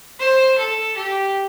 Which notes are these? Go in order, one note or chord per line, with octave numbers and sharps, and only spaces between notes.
C5
A4
G4